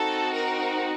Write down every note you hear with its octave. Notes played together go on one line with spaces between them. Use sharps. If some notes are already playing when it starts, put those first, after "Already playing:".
Already playing: C4 D#4 F#4 A4
A#4